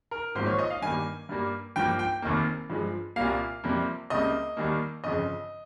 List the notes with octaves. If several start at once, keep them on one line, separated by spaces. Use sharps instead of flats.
A#4
G#1 G#2 F3 A#3 C5
C#5
D#5
F5
G2 D#3 G3 A#3 G#5
G2 G3 A#3
G2 F3 A#3 G5
G5
F1 D#2 D#3 A#3
G2 F3 G#3
C2 A#2 G3 A#3 F5
F2 C3 G3 A#3
C#2 C3 G3 A#3 D#5
D#2 D#3 G3 A#3
G1 F2 C#3 D#5